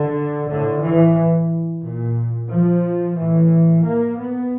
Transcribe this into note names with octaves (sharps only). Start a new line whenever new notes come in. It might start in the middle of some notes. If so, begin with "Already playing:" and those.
Already playing: D3
A2 D3
E3
A#2
F3
A2 E3
A#3
B3